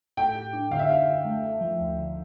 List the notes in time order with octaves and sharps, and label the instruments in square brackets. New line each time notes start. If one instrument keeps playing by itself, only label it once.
[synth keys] A2 [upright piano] G5
[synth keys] G4
D4
[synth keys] D3 [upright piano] F5
[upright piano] E5
[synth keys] G4 [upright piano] F5
[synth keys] D3
A3
A3
F3
D2
D3